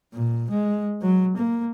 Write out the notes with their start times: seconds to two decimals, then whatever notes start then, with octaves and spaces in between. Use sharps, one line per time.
0.13 A#2
0.50 G#3
1.02 F#3
1.37 A#3